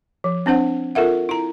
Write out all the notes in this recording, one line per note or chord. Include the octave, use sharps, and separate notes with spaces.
F3
C4 D4 C5 F#5
F4 A4 A#4 E5 F#5
E4 A#5